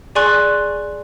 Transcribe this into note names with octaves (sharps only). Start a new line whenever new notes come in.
G#4 D5 G#5 C6 C#6 F#6